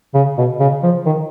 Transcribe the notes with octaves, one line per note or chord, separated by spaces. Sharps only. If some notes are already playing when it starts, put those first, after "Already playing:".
C#3
B2
C#3
F3
D#3